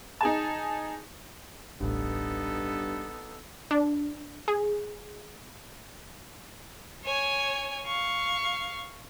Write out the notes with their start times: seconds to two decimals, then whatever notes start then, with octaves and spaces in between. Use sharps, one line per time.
0.21 D#4 G#4 A5
1.81 D1 A1 G2 B3 D#4 A4
3.71 D4
4.48 G#4
7.05 C#5 G#5
7.87 F5 C#6